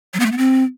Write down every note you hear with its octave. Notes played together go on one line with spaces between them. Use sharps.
F#3
B3
A3
B3
C4